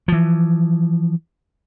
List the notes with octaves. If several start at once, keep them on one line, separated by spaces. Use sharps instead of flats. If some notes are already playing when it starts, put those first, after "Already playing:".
E3 F3